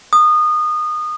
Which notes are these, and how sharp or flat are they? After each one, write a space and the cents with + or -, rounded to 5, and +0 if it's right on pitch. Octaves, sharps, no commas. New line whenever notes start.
D#6 -25